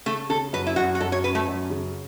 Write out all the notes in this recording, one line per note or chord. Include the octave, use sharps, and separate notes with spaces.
C#3 A3
C#3 A4
F#2 B4
E4
F#2 F#4
F#4
F#2 A4
C#5
C#4 B4
A3
F#2
C#3